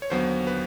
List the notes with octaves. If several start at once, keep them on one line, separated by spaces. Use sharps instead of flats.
C#5
D#2 D3 F#3 B3 C5
B4